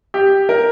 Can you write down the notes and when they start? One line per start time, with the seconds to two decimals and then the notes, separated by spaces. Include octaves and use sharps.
0.14 G4
0.49 A#4